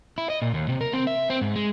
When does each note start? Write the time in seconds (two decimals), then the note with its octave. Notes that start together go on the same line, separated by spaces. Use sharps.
0.18 E4
0.30 D#5
0.42 A#2
0.54 D#2
0.69 C3
0.81 A#4
0.93 C4
1.07 E5
1.30 C4
1.41 G#2
1.56 G#3